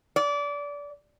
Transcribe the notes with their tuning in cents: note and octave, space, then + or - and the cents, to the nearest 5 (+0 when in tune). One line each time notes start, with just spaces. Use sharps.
D5 -25